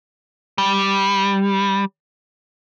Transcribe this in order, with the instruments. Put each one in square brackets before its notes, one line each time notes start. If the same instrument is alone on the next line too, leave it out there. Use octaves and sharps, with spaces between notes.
[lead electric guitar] G3